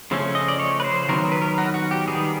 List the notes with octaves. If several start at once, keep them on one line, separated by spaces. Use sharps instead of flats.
C#3 F3 A3 C#4
D#5
D5
C#5
B4
C5
D#3 F#3 B3 A#4
B4
A#4
F#4
F#4
G4
D#3 G3 B3 G#4